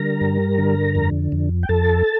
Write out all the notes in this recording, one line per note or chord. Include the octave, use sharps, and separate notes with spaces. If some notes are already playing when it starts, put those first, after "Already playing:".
Already playing: D3 G3 A#4 A#5
G2
D3
F2
F2
G5
F2 A4 A5